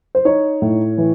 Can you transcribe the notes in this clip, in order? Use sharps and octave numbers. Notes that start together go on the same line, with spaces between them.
C5
D#4 C#5
A2
E3